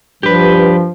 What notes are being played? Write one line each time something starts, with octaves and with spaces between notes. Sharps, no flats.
G2 F3 G4 B4